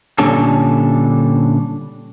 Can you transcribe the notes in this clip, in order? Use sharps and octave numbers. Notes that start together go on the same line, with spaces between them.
A#2 D3 G3 C#4 D4 A4